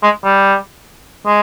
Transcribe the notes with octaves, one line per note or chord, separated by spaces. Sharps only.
G#3
G3
G#3